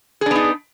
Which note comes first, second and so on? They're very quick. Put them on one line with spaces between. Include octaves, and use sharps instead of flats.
G#4 D4 B3 D#4